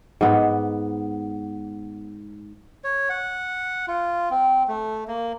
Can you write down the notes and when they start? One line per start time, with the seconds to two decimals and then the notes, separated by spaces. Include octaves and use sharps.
0.21 G#2 B3
2.84 C#5
3.10 F#5
3.88 F4
4.31 C4
4.68 A3
5.08 A#3